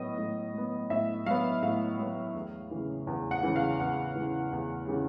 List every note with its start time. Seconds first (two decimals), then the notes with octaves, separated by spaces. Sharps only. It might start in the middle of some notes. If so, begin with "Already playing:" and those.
Already playing: A2 F#3 B3 D#5
0.18 A2
0.54 F#3 B3
0.90 A2 E5
1.26 F#3 B3 F5
1.63 A2 F5
1.99 F#3 B3
2.35 E2
2.71 C#3 E3
3.07 E2
3.31 F#5
3.43 C#3 E3
3.56 F5
3.80 E2 F#5
4.16 C#3 E3
4.52 E2
4.88 C#3 E3